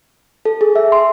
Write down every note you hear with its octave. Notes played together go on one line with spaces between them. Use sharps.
A4
G#4
E5
C6